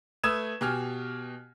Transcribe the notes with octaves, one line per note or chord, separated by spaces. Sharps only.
A3 B4 D#6 E6 G#6 E7
B2 G4 G#5 F6